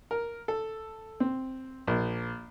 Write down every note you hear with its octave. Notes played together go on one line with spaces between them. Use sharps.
A#4
A4
C4
A#1